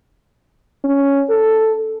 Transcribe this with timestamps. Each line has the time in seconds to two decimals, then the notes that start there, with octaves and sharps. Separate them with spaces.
0.84 C#4
1.30 A4